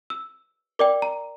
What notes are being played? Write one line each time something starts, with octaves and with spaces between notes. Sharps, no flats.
E6
A#4 D5 G5 D6
A#5